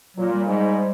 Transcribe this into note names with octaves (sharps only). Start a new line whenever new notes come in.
A#2 F#3
G3
G#2